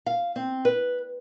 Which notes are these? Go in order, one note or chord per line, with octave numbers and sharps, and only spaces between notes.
F5
C4
B4